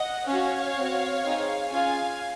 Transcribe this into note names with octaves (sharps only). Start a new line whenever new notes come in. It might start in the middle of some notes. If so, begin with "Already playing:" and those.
Already playing: D#5 F#5
C#4 F#4 C#5 F5
C4 F#4
C4 D#4 G#4
C#4 F4 G#4 F5 G#5